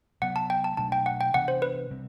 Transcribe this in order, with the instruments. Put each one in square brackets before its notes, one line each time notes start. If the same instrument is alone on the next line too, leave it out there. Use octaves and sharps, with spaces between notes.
[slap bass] C3 F#3 B3 [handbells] F#5
[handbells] A5
G5
A5
[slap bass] B2 F#3 A3 D4 [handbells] A5
[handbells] G5
F#5
G5
[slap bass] C3 E3 B3 D4 [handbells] F#5
[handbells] C5
B4
[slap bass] C3 G3 C4